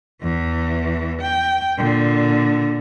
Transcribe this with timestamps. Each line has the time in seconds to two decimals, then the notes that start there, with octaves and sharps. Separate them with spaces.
0.22 E2 E3
1.21 G5
1.77 A#2 D3